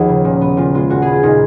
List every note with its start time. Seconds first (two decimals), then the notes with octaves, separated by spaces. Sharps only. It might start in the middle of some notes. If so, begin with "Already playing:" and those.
Already playing: D#2 F3 B3 D#4 F#4 G#4
0.09 C#3
0.25 A#2
0.41 B3
0.57 A#2 F4
0.74 G#3 F4
0.90 A#2 F#4
1.02 B3 G#4
1.12 F4
1.23 A#2 D#4